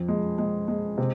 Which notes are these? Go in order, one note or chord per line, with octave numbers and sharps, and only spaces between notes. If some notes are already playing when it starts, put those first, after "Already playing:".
Already playing: F2
G#3
G#3
G#3
C3